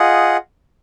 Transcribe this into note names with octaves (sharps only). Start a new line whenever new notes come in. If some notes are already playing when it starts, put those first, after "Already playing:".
Already playing: F4 G#4 D#5 F#5